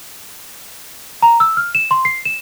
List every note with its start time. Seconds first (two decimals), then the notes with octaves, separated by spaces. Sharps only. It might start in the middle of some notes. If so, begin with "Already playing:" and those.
1.22 A#5
1.40 E6
1.57 F6
1.75 E7
1.91 C6
2.05 C7
2.25 E7